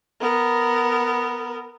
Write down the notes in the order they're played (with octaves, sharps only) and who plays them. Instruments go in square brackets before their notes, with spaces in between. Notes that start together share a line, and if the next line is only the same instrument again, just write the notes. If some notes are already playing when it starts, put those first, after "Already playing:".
[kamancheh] B3 A#4